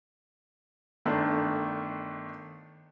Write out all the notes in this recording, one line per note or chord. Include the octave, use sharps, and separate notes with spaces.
G1 D#3 A3 D4